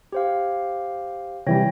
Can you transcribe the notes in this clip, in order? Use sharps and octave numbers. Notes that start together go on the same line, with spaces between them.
G4 C5 F5
C3 E3 G3 C#5 G5 A#6